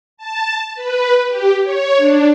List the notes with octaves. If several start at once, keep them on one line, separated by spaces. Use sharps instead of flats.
A5
B4
G4
C#5
D4